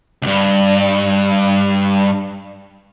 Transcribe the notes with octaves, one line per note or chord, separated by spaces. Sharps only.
C#2 G2